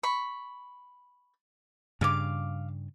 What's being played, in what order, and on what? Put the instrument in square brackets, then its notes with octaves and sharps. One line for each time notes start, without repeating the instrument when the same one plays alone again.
[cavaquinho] B5 C#6
[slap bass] G2 C#3 [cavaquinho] F5 D6